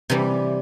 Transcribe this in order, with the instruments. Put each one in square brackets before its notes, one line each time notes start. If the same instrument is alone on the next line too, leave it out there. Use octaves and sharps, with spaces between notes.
[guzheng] C3 E3 G3